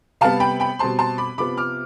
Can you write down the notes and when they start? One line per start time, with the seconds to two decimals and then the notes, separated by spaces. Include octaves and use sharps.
0.21 C3 G3 B3 F5 A5
0.40 G5 B5
0.60 G5 B5
0.79 B2 G3 C4 A5 C6
0.99 A5 C6
1.18 B5 D6
1.38 C3 F3 B3 B5 D6
1.57 D6 F6